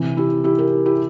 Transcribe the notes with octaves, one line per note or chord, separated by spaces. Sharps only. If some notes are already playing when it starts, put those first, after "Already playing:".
Already playing: C3 E3
E4 G4
E4 G4
G4 A#4
E4 G4